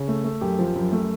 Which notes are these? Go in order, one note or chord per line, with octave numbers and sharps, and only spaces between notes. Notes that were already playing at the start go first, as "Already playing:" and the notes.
Already playing: C#3
A3
A3
F#2 G4
F3
F#2
A3